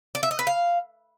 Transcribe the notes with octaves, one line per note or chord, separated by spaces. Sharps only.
D5
E5
D#5
B4
F5